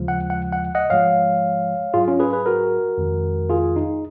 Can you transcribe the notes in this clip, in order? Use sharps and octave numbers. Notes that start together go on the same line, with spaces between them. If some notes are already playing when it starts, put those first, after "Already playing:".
Already playing: D#2 C#3 F3 G#3
F#5
F#5
F#5
D#5 F#5
G#2 F3 G#3 C#5 F5
G#2 F#3 F4 G#4
C#4 F4
G#4 B4
G#4 B4
F#4 A#4
F2 D#3 G#3
F4 G#4
D#4